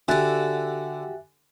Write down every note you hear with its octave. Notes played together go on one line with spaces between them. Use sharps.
D3 F#4 G4 E5 G#5 F#6 A6